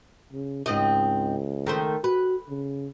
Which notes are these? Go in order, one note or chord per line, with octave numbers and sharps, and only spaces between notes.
C#3
C#2 G#2 C4 D#5
D#3 A3 C5
F#4 B4
C#3